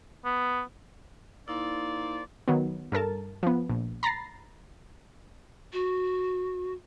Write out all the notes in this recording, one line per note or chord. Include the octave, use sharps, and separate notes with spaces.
B3
A#3 D#4 E4 C5 D5
D#3 F#3 B3
G2 A4 A#4 A5
F3 B3
A#1
A#5 B5 A6 A#6 C7
F#4